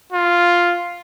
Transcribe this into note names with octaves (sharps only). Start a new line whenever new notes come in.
F4